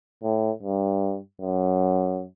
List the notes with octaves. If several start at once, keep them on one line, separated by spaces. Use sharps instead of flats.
A2
G2
F#2